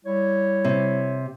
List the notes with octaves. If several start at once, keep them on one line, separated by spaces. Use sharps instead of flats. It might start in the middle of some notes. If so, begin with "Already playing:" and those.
G3 E4 C#5
C3